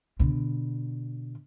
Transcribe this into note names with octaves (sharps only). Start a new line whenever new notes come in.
B2 D3